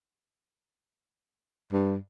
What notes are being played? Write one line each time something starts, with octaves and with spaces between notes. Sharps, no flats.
G2